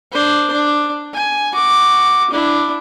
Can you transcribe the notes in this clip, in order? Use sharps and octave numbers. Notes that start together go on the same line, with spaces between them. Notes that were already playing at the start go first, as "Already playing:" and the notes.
D4 C5
D4
G#5
F#4 D6
D4 E4